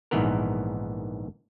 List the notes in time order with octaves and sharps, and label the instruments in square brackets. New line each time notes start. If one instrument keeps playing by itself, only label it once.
[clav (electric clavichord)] A#1 G#2 D#3 E3 B3 A#4